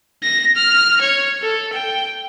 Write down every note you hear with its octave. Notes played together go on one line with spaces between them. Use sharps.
A#6
F6
C#5
A4
G5